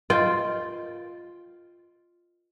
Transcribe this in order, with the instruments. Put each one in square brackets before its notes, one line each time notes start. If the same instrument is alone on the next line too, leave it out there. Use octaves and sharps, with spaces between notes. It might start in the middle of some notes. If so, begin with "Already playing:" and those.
[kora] F4 G5 [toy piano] A#4 D#5